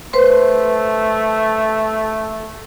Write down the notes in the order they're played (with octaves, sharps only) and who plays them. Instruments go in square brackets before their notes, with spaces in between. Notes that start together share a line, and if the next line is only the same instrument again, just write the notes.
[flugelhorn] A3 [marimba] B4 C5 C6